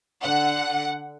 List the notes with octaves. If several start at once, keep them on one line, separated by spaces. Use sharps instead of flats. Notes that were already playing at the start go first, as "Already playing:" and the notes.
D3 F#5